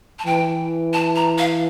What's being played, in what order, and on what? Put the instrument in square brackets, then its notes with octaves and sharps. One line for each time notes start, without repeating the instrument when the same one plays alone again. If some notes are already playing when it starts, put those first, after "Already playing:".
[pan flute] A5
[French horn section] E3 [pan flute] G5
[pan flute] A5
A#5
F5